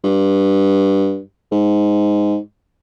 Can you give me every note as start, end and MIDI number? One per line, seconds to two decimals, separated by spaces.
0.04 1.20 43
1.52 2.37 44